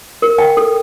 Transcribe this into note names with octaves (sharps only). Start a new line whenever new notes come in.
A#4
G5
A4